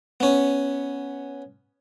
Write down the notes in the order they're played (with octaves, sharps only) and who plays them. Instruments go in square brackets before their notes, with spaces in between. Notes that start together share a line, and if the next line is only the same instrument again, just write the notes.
[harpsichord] B3 C#4